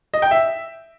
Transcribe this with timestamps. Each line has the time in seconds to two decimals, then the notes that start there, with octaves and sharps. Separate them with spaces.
0.14 D#5
0.22 G5
0.31 E5